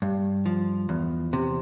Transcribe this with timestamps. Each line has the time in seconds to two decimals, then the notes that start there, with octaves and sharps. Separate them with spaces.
0.02 G2
0.46 F3
0.89 E2
1.33 C3